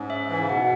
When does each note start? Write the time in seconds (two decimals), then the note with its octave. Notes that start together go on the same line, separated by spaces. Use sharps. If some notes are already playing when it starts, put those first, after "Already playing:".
Already playing: G#2 C#4
0.10 E5
0.29 E3
0.40 C#3
0.49 B2 F#5